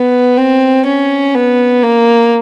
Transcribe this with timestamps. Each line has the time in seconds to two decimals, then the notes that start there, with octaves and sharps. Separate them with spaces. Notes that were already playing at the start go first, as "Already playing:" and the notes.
Already playing: B3
0.37 C4
0.86 C#4
1.35 B3
1.82 A#3